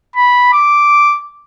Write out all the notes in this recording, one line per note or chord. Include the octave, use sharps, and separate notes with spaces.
B5
D6